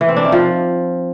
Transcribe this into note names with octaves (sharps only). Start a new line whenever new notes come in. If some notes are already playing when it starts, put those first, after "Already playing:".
E3
C4
D4
D#3
F3